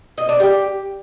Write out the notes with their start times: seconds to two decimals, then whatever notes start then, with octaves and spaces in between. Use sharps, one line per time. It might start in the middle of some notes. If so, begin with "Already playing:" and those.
0.18 D#5
0.29 D4
0.40 G4